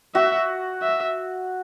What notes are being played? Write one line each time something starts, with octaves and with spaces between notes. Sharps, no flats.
F#4 E5
E5